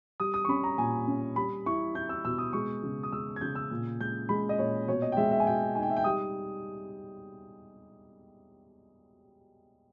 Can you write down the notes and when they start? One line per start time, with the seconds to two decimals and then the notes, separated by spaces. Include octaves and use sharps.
0.20 G3 D#6
0.34 D#6
0.45 C#6
0.48 C#4 B5
0.64 A#5
0.77 A#2 G#5
1.07 C#4
1.36 G3 B5
1.66 E4 C#6
1.95 E4 G6
2.09 E6
2.25 B2 E6
2.38 D#6
2.53 G#3 C#6
2.83 C#3
3.03 D#6
3.12 G#3 E6
3.36 G#6
3.41 C#3 G6
3.55 E6
3.71 A#2
4.00 G#3 G6
4.29 G#3 B5
4.49 D#5
4.59 A#2 C#5
4.88 B2 C#5
5.02 D#5
5.12 G5
5.17 G#3 E5
5.31 E5
5.40 G#5
5.46 B2 G5
5.75 D#4 G#5
5.83 G5
5.90 E5
5.96 G5
6.04 G3 D#6